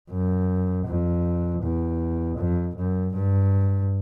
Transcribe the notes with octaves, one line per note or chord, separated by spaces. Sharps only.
F#2
F2
E2
F2
F#2
G2